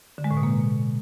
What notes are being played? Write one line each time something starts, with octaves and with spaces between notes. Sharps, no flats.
D3
G#3
A2
B2
A#3